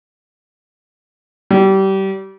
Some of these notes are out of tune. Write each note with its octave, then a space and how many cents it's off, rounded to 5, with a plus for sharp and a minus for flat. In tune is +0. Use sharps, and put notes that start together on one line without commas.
G3 -25